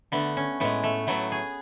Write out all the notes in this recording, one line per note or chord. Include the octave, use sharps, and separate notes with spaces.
D3 A3 B3
C#4
A2 G#3 B3
A3
A2 F#3 A3 B3
G#4